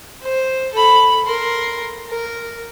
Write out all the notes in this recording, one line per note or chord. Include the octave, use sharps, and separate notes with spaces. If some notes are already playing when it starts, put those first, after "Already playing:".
C5
A4 B5
A#4 C6
A#4